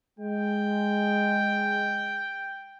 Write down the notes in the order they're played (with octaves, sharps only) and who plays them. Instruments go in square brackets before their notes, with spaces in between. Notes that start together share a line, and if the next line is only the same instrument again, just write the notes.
[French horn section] G#3 [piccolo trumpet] G5